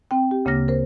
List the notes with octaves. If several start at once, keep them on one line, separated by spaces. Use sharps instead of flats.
C4 G5
G4
D2 C#3 A#3 D6 F6 A#6
A#4 C5